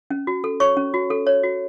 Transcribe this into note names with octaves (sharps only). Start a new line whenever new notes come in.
C#4
F#4
A4
C#5 C#6
C#4
F#4
A4
C#5
F#4